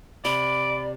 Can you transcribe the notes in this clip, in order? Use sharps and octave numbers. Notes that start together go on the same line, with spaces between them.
C3 D5 B5 D6